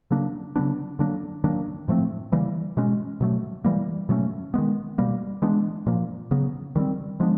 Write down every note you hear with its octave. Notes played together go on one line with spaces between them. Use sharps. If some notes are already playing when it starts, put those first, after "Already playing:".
C#3 F#3 A#3 D4
C#3 F#3 B3 D4
D3 F#3 A#3 D4
D#3 F#3 A#3 D4
A2 F3 A3 C4
C#3 E3 G3 A#3
B2 G#3 C#4
B2 F#3 A3
E3 G3 A#3
B2 F#3 A3 C#4
D#3 G#3 B3
B2 G3 A#3
E3 G#3 B3 D4
A#2 F3 A#3
C#3 F#3 B3
D#3 G3 C4
F3 G#3 B3 D4